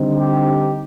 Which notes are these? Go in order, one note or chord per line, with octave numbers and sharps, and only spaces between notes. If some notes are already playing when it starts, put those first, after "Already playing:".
Already playing: D3 G3 C4 D#4
G4